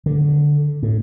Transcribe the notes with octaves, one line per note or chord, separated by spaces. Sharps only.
D3
A2